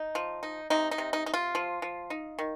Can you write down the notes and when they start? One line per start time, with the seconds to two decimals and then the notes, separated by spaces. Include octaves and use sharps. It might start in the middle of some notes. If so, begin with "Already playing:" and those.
Already playing: D#4
0.15 F3
0.43 D#4
0.70 C3 D#4
0.91 D#4
0.98 C3
1.13 D#4
1.26 D#4
1.34 F4
1.55 F3
1.82 F3
2.10 D#4
2.39 D#3